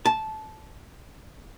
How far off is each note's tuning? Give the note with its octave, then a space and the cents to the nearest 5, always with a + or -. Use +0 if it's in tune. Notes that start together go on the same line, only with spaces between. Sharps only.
A5 -15